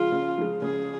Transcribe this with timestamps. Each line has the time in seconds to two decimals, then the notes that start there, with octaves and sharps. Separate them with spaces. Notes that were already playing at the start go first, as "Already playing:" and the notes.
Already playing: C#3 F3 G#3 F4
0.12 C#3
0.38 F3 G#3
0.62 C#3 G#4